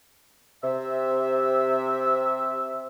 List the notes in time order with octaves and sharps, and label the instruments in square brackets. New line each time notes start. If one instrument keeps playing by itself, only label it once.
[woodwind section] C3 E5